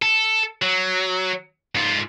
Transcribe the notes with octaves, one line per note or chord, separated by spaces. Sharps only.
A4
F#3
G#2 F4